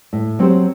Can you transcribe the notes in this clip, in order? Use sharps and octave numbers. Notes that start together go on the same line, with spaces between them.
A2
F#3 C4 G4 C5